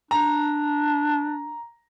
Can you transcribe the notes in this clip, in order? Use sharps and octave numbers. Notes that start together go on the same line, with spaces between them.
D4 A#5